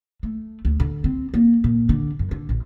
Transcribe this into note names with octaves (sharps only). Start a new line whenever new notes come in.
A3
D2
D3
C4
A#3
A#2
D3
F#2
D3
A#1